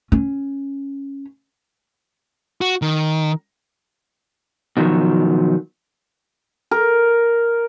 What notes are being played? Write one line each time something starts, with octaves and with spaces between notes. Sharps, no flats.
C#4
F#4
D#3
B2 D#3 F3 F#3
A#4